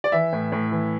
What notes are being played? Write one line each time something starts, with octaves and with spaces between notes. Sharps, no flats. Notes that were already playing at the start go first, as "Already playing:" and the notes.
D5
E3 E5
A2
A2
E3